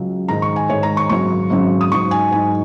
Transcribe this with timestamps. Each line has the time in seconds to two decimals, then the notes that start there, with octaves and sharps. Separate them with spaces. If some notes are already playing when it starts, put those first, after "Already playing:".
Already playing: C#2 C#3 F#3
0.28 G#2 D#3 G#3 D#4 A#5
0.42 C#6
0.56 G#5
0.70 G#2 D#3 G#3 D#4 C#5
0.83 A#5
0.97 C#6
1.09 G#1 F#2 C#3 F#3 C#6
1.50 G#1 F#2 C#3 F#3
1.81 D#6
1.92 G#2 F#3 D#4 C#6
2.11 G#5
2.32 G#2 F#3 D#4 G#5